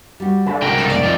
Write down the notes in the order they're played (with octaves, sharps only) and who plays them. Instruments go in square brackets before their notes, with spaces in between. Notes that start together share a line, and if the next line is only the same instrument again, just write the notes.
[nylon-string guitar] G3 F#4
[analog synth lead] D3 [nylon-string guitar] A3
[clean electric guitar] C2 G5 [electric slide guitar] G#2 C#3 A#4 [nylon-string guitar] F#4
[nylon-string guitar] F#3 [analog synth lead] A4
[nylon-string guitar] F2 A#2 A3 [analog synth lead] D5
[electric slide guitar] D#3 F3 C4 [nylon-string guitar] D#5